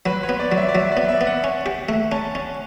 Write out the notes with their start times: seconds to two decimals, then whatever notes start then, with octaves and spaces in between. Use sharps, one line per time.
0.06 F#3 B4
0.23 C#5
0.29 B3
0.39 D5
0.52 F#3
0.57 E5
0.69 D5
0.74 F#3 E5
0.92 D5
0.97 B3
1.08 E5
1.21 B3
1.27 F#5
1.44 C#4
1.66 G4
1.89 A3
2.12 C#4 A5
2.35 C#4